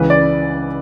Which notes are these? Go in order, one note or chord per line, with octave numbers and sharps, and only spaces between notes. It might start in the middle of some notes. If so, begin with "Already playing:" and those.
Already playing: C#2 C#3 E3 B4
D5